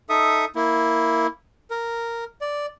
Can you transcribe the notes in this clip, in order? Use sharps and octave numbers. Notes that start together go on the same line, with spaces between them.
D#4 A4 E5 D#6
A#3 E4
A#4
D5